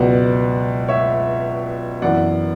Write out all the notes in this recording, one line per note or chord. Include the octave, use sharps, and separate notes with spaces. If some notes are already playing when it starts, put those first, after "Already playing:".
Already playing: C#2 B2 F#3 B3 D5 F#5
C#5 E5
F#2 E3 B3 D5 F#5